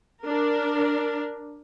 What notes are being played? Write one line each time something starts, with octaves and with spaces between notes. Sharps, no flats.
D4 A#4